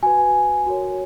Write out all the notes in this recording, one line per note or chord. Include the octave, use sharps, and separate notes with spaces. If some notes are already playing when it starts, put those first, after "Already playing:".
F#4 B4 G#5
F#4 A#4 C#5